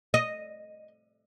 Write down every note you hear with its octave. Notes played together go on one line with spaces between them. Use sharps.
D#5